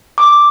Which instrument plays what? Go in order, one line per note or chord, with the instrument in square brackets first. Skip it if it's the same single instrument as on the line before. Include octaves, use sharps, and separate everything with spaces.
[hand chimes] D6